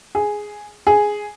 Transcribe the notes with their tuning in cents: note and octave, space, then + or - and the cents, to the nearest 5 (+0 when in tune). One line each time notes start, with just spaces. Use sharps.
G#4 +0
G#4 +0